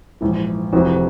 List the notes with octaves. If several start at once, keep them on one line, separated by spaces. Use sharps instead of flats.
A#1 G#2 E3
F1 F2 C3 E3 F#4